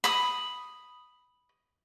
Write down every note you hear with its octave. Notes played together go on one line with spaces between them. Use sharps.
B5 D#6